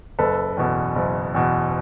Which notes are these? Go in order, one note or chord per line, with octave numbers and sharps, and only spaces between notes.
F#1 A4 B4
E2 B2
F#1
E2 B2